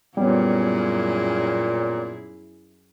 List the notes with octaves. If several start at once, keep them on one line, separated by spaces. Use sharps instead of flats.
F#2 A#2 G3 B3 C#4 E4 G#4